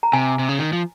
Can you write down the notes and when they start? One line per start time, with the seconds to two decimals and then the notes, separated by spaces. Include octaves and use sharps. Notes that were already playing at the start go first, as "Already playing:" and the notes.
0.03 A#5
0.13 C3 G#5
0.39 C3
0.49 C#3
0.59 D#3
0.73 F3